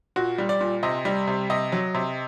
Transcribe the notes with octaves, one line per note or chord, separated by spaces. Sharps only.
A#2 F#4
G3
D5
A#2
C3 D#5
G3
C3
C3 D#5
F#3
C3